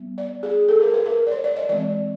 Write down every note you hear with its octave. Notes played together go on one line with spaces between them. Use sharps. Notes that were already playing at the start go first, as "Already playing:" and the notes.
Already playing: G3 B3
D5
G#4
A4
A#4
B4
A#4
D5
C#5
D5
D#5
E3 G#3 C4 D5